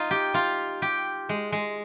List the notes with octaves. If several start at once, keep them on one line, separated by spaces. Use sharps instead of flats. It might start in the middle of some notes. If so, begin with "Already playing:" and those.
Already playing: D#4 F4
G4
F4
G4
G#3
G#3